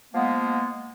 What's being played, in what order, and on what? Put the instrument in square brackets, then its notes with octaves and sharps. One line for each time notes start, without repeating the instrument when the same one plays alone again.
[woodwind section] F3 G#3 A#3 B3